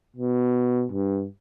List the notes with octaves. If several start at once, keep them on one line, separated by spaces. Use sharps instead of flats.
B2
G2